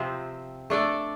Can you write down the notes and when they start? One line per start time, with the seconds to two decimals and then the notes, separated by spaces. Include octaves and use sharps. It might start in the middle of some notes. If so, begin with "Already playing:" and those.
Already playing: C3 F3 C4
0.70 A3 D4 A4 D5